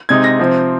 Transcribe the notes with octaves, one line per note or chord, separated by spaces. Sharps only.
C3 G#3 D#4 G#6
A#6
C3 F3 C4